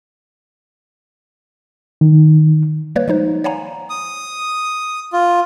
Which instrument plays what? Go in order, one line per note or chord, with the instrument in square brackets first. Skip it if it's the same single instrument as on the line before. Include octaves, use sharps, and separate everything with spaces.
[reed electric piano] D#3
[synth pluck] G3 A#3 B4 C#5
F3 G#3 D#4 C5
C#5 D5 F5 F#5 G#5 A#5
[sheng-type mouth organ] D#6
F4